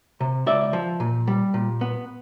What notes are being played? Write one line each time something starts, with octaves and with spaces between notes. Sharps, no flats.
C3
C#2 D5 E5
F3
A#2
G3
A#2
B3